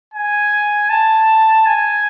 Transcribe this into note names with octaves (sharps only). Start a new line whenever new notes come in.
G#5
A5
G#5